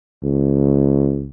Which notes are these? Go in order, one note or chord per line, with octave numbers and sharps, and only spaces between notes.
C#2